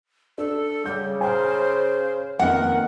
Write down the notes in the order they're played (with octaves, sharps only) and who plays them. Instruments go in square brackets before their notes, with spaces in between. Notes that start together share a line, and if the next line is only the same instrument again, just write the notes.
[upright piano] D4 [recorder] A4
[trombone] C#3 [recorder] G3 [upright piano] G6
[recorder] C5 [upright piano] G#5 A#5 F6
[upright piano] F2 A#3 B3 [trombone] D#3 [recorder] A#4 [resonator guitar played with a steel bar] F#5